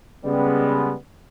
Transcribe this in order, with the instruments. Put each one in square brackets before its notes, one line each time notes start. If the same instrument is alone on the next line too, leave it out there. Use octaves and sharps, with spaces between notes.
[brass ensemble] C#3 G3 G#3 B3